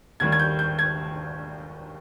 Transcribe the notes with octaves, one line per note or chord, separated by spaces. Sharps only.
D#2 D#3 G3 G#6
G#6
G6
G6
G#6